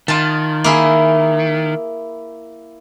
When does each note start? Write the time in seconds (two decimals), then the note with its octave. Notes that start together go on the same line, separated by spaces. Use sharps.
0.08 D#3 F4 A5
0.64 A#3 E4 G#4